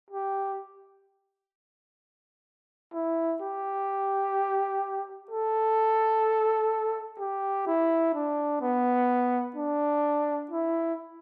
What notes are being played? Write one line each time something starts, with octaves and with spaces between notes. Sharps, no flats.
G4
E4
G4
A4
G4
E4
D4
B3
D4
E4